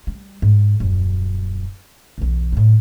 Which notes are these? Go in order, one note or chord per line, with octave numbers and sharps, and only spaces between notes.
G3
G#2
D#1 F#2
B1 E2
A2 G3